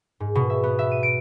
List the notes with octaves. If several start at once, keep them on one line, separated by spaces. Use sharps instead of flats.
G#2
B2
E5
B3
E5
D#7
D7